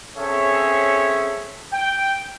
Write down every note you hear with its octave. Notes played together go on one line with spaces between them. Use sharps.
C4 C#4 G#4 A4 C#5 E5
G5